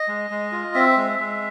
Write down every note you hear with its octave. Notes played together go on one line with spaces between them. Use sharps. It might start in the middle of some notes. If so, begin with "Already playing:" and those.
Already playing: D#5
G#3
G#3
F4
C4 E5
G#3
G#3